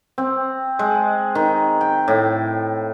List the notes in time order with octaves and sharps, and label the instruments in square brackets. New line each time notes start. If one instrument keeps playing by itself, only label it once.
[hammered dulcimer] C4
G#3
D#3
G5
A2